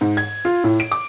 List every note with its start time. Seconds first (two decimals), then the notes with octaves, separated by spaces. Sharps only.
0.01 G#2
0.17 G#6
0.45 F4
0.64 A2
0.80 D7
0.92 D6